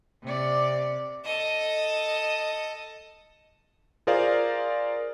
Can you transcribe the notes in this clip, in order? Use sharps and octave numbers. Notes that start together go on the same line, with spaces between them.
C3 D5
A4 D#5
F4 G#4 A#4 C5 D5 F5